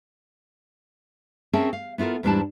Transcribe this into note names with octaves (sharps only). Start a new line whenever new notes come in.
C4 C#4 G#4 A#4 E5 A5
F5
B3 E4 F4 A4 A#4
E2 G#2 G3 D4 E4 A5